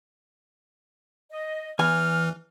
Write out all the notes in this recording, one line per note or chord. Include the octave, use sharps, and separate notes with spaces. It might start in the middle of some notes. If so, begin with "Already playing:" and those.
D#5
E2 E3 G#5 F6